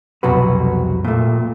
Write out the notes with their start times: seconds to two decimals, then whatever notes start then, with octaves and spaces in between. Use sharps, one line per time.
0.23 C2 F2 B2 F#3 F#4 B4
1.04 A#2 A3